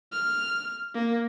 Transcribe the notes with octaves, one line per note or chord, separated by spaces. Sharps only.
F6
A#3